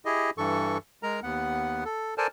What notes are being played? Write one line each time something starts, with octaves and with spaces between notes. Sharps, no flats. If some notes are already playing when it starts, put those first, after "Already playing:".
E4 G4 G#4 D#5
G2 E3 A4 C#6
G#3 A#4 A#5
D#2 B3 F#5
A4
A4 A#4 C5 D5 G#5 A5